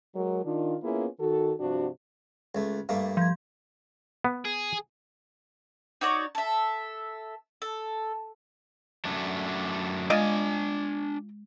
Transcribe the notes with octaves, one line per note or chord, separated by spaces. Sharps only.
F#3 G#3 A#4
D#3 D4 F4
A#3 B3 C#4 E4 F4 G#4
D#3 F#4 A4
G2 C3 F3 D4 F#4
C#2 A3
G2 A3 A#3
F3 G#6
B3
G#4
D#4 F#4 C#5 D5
A4 E5
A4
F#2 A3 D4
G#3 D4 F4 D5 D#5 G#5